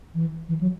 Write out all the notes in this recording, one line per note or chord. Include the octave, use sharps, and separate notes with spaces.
E3
E3
F#3